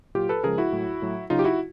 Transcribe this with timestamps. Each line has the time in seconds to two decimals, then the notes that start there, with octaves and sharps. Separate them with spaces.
0.15 A#2 F#3 F4 G4
0.29 A4 B4
0.43 C#3 F3 G#3 G#4 A#4
0.58 E4 F#4
0.72 A2 F#3
1.02 A2 F#3
1.30 C#3 F#3 D#4 F4
1.39 G4
1.45 E4 F#4